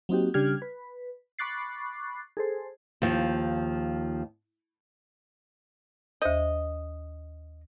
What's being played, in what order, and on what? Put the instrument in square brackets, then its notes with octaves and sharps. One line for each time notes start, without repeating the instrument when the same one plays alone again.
[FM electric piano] F#3 A#3 C4 D#4 F#4 G4
C#3 G3 D4 G4 F6 G#6
B4
B5 C#6 D6 F#6 A6 C7
G#4 A4 C5
[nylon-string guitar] D#2 F3
[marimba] D#2 C5 G6 [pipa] D#5